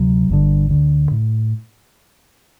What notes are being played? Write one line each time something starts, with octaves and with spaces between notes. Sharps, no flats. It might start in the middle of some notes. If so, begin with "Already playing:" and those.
Already playing: D2 C3 F#3
G1 G2 D3
D2 D3
A2